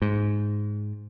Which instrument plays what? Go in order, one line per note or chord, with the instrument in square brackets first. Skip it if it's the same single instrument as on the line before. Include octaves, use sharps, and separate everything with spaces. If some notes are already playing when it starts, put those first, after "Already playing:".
[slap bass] G#2